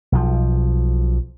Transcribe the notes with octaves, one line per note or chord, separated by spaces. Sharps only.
B1 F3